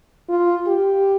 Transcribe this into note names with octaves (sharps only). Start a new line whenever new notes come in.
F4
G4